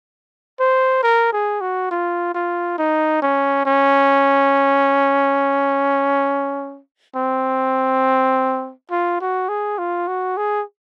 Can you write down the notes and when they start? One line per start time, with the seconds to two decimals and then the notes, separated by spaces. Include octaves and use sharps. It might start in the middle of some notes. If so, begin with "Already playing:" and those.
0.60 C5
1.03 A#4
1.32 G#4
1.61 F#4
1.91 F4
2.35 F4
2.78 D#4
3.22 C#4
3.65 C#4
7.15 C4
8.91 F4
9.21 F#4
9.49 G#4
9.79 F4
10.08 F#4
10.37 G#4